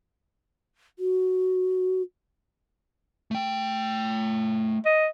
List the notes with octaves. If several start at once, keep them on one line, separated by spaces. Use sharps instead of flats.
F#4
A3 G5
D#5